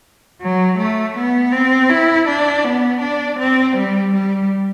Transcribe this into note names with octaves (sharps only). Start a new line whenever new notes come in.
F#3
A3
B3
C4
E4
D4
B3
D4
C4
G3
G3